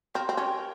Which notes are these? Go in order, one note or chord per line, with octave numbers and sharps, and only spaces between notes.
C4 G4 A#4
C4
C#4 G4 A#4